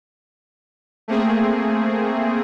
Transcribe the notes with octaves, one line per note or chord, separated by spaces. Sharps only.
A3 A#3 C4 G#4